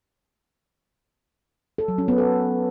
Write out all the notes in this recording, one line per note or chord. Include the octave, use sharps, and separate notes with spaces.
A4
F#3
C#4
B3
A4